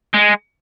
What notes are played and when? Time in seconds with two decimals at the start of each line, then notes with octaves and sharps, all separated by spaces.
0.14 G#3